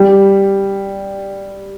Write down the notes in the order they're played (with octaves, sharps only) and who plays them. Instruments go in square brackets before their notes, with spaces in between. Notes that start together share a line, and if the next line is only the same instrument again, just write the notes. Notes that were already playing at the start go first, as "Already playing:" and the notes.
Already playing: [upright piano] G3